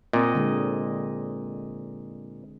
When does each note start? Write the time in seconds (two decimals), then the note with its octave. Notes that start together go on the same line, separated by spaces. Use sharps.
0.13 A#2 C4 D#5
0.35 D3 G#3